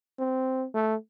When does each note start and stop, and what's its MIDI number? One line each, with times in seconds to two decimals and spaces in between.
0.19 0.66 60
0.74 0.95 57